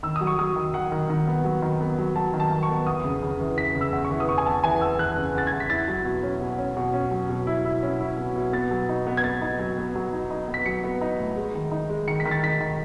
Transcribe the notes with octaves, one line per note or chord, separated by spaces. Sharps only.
D#3 E6
F#3 D#6
C#6
F#3 D#6
D#3
D#3 F#5
D#3
D#3
B3
F#3
D#3
B3
F#3
F#3 A5
D#3
A5
D#3
C#6
B3
E2 D#6
C#3
C#3
E3
E3 B6
C#3
E6
E2
C#6
E3
D#6
E2 C#6
G#5
E2 A5
E3 G#5
E2 E6
E3 F#6
C#3
E2 A6
G#6
E2
B6
E4 A6
F#3
B2
C#4
B2
C#4
B2
C#4
F#3
B2
E4
E4
C#4
E4
B2
B2
B3 A6
F#3
D#4
B3
G#6
B3 A6
D#4
F#3
B3
F#3
D#4
D#4
B3
B6
F#3 C#7
B3
D#4
A2
G#3
D#3
D#4
G#3
D#3 C#7
B6
D#3
A6
D#4 B6
D#3